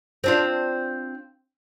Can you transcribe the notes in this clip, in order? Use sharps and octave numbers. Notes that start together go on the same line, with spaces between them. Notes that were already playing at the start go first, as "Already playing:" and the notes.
C4 D4 F4